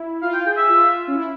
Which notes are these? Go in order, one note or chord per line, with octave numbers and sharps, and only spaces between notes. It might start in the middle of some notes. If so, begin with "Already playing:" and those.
Already playing: E4
F4 F5
G5
G#4 G5
E5
F4
C#4
E4